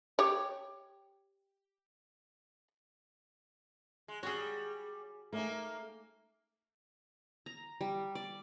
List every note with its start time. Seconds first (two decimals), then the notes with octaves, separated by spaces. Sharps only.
0.19 G4 C#5
4.08 G#3
4.23 G3 F#4 G#4 C#5
5.33 A3 A#3 C#4 D#4
7.46 A#5
7.81 G3
8.15 D5